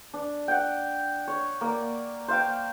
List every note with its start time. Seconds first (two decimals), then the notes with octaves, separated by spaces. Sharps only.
0.13 D4
0.48 F#5 G5
1.28 C#5
1.61 A#3 D5
2.28 C5 F5 G5